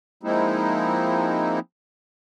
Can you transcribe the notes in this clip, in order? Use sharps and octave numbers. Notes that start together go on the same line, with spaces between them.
F3 G#3 A#3 C4 D#4 E4